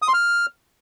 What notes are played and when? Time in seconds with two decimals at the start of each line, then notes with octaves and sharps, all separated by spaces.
0.02 D#6
0.08 C6
0.14 F6